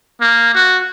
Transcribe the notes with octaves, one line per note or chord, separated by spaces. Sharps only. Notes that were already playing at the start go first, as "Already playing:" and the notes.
A#3
F#4